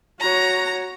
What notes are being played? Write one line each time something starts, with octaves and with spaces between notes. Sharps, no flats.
F#4 C#5 A#5